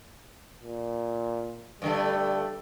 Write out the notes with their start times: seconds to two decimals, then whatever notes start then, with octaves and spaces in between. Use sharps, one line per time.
0.63 A#2
1.82 G2 D3 G3 A3